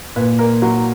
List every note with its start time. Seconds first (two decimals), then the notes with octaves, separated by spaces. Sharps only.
0.16 A#2 B4
0.39 A#4
0.62 F#3